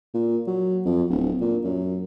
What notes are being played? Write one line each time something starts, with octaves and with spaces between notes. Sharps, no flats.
A#2
F#3
F2
D1
A#2
F#2